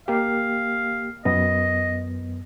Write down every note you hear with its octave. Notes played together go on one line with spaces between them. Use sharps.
A#3 G4 F5
F#2 B3 D#5